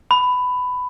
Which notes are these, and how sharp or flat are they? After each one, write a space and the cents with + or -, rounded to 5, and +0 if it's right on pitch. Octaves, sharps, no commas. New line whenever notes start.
B5 +15